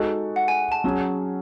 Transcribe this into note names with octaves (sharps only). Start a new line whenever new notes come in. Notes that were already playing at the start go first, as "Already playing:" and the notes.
Already playing: G#3 D#4 F#4 A4
F#5
G#5
A5
F#3 C#4 G#4